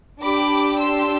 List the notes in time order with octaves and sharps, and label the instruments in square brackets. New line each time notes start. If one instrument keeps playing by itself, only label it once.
[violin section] D4 G4 B5 D6
C6 E6